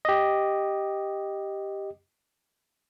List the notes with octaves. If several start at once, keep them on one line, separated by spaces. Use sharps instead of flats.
G4 D#5